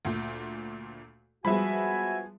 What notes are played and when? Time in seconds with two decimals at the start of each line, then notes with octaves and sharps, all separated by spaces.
0.05 D2 A#2
1.45 F3 G3 G#3 B3 F#4 E5 G#5 B5